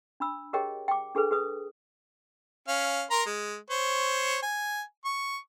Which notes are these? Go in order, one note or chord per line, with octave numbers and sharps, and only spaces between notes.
D4 B5 E6
G4 G#4 A#4 C#5 D#5 G5
G5 D6
D4 G#4 A4 B4
G#4 B4 D#6
C#4 F5
A#4 A#5 C6
G#3
C5 C#5
G#5
C#6